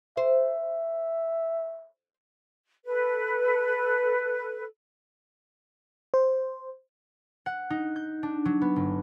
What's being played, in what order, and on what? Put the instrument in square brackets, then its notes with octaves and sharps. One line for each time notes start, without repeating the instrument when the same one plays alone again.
[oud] C5 [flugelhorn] E5
[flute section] A4 B4
[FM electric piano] C5
[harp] F#5
D#4
G6
D4
F#3
B3
G1